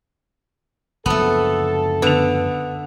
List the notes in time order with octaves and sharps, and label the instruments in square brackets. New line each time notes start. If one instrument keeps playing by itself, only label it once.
[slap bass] F#1 D2 F3 [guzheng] A3 B3 [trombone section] A4
[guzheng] D3 [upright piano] B3 F7